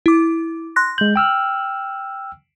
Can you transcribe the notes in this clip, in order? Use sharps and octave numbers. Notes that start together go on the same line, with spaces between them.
E4 D6
C6 F#6 A#6
G#3 G6 F#7
G5 E6 F6